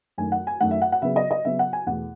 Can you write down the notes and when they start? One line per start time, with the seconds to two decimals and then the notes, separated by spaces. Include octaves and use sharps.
0.18 F#2 D#3 A3 G#5
0.32 F#5
0.47 G#5
0.61 F#2 D#3 A3 F#5
0.71 E5
0.82 F#5
0.92 F#5
1.02 C#3 F#3 B3 E5
1.16 D#5
1.31 D#5
1.45 C#3 F#3 B3 E5
1.59 F#5
1.73 G#5
1.86 E2 B2 A3 F#5